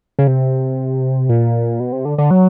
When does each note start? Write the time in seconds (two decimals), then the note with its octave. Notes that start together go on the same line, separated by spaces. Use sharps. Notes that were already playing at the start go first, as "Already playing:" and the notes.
0.19 C#3
0.27 C3
1.29 A#2
1.80 B2
1.92 C3
2.05 D3
2.18 D3
2.31 F#3